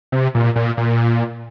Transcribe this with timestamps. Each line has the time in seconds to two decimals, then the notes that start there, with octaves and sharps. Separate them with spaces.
0.12 C3
0.35 A#2
0.56 A#2
0.77 A#2